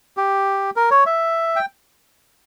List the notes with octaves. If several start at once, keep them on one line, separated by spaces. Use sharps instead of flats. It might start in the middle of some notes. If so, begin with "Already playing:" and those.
G4
A#4
C#5
E5
G5